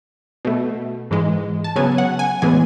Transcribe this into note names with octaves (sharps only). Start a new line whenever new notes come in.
B2 A3
G#2 E3 G#3
A5
C#3 F#3 B3 G#5
F#5
G#5
A2 E3 G#3 B3 G#5